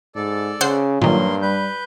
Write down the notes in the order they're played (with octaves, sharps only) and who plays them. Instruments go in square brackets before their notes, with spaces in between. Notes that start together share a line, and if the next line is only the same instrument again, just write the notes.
[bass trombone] G#2 [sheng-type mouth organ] A4 D5
[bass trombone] C#3 [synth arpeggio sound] C5 F#5 C7
[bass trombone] G2 [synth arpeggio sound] A#2 D#3 [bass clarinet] F#3 [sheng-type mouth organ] A#3 C6
[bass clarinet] G3 [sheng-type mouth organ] B4 G6